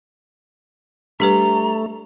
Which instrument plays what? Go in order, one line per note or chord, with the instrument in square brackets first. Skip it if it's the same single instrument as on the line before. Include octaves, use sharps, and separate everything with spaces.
[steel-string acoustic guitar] G3 [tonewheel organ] A3 [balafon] D4 G4 B4 [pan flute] A#5